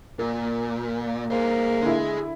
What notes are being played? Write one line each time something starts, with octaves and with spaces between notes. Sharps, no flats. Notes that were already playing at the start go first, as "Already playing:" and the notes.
A#2 A#4
A#3 G#4 C5
D3 E4 G#4 C6